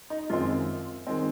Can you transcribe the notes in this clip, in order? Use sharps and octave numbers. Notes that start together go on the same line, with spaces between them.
D#4
F#2 D#3 G#3 C4 F4
D#3 G#3 C4